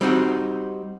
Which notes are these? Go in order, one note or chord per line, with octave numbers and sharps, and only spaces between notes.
G3 C4 D#4 F#4